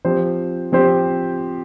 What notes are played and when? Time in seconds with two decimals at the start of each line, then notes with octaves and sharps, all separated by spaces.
0.05 F3 C4 G4 C5
0.72 F3 C4 G4 C5